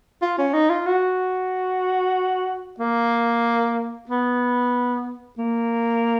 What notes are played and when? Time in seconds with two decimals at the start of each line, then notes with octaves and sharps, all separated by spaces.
0.22 F4
0.38 C#4
0.54 D#4
0.70 F4
0.86 F#4
2.80 A#3
4.09 B3
5.38 A#3